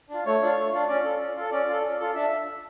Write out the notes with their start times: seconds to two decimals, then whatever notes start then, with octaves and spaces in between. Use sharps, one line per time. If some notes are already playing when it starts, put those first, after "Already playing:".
0.10 D4 F4
0.26 A3 C#5
0.42 D4 F4
0.57 A3
0.73 D4 F4
0.88 C#4 D5
1.05 F4 A4
1.20 C#4
1.36 F4 A4
1.52 C#4 D5
1.68 F4 A4
1.84 C#4
2.00 F4 A4
2.15 D4 E5